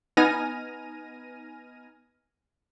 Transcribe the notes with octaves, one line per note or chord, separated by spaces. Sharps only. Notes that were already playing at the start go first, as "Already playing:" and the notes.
B3 D#4 G#5 F6 A#6 D#7